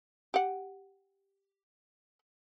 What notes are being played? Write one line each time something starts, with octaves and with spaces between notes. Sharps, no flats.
G4 F#5